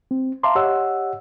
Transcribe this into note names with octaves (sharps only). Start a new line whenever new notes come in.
C4
E5 F5 A5 A#5 C6 D6
G4 C#5 D#5 F#5 E6